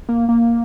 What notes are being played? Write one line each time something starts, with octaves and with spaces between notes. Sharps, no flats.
A#3
A#3